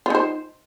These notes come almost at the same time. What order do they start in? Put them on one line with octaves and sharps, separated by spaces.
F4 D#4 C5